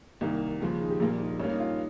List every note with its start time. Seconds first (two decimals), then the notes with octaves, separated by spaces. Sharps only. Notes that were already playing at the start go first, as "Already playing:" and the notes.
0.21 C2 C3 D#3 A#3 D#4
0.60 D#2 C#3 F3 G#3
0.81 D#4
0.90 G4
1.00 A#1 A#2 G3 A#3
1.20 D#4
1.39 G2 G3 A#3 C#4
1.49 D#4
1.60 F4
1.69 D#4